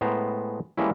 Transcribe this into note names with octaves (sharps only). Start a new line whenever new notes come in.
A2 G#3 B3 C5 A#5
E3 G3 G#3 A#3 C#4 E4